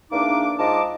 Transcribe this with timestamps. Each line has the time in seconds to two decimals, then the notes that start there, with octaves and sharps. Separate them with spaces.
0.12 E2 A#3 D4 D#4 D6
0.59 G#2 F4 D#5 A5 D6